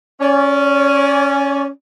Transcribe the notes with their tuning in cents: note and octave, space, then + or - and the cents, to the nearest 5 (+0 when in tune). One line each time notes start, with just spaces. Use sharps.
C#4 +0 D5 -35